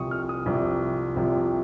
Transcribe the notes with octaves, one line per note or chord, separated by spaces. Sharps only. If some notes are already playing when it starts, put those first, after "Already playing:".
Already playing: C2 C3 F3 C#6 D#6
F6
D#6
C2 C3 F3
C2 C3 F3